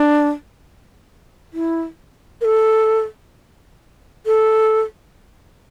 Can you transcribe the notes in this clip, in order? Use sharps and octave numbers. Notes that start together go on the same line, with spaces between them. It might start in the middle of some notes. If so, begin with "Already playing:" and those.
Already playing: D4
E4
A#4
A4
A4